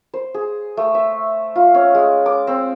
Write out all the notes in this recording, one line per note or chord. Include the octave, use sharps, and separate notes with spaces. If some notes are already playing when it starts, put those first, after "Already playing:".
C5
G#4
A3
E5
F4
C#4
G#3
D6
C4